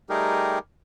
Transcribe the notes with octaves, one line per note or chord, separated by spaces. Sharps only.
G3 A3 D#4 G4 G#4 A#4